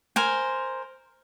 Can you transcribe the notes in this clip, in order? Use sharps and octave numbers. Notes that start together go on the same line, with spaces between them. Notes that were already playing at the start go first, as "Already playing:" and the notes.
A#4 C5 G#5